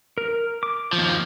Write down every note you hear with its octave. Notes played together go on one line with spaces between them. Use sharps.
A#4
D6
D#2 F3